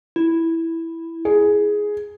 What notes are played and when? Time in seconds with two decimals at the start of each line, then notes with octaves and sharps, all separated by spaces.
0.16 E4
1.25 G#4